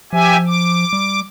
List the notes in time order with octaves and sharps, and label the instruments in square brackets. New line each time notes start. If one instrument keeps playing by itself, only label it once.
[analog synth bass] F3 [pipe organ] G4 E5 G#5
[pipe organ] D6
[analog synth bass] G3